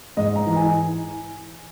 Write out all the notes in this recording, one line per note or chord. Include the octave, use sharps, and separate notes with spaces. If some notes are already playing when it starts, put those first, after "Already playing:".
G#2 D#5
A#5
E3
G#5